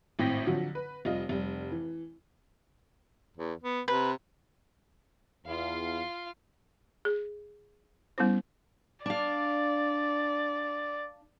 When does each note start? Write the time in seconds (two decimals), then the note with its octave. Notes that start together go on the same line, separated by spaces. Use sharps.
0.19 G#1 A2 C4 G5 A#6 B6
0.46 D3 F3 F#3
0.75 B4
1.05 F1 G3 F4 D#5
1.29 F1 G3
1.72 E3
3.37 E2
3.63 B3
3.88 C3 B4
5.46 E2 F4 F5
7.05 G#4
8.18 G3 B3 C#4 E4 C5
9.06 D4 D5 F5